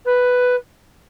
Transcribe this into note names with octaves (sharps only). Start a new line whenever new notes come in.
B4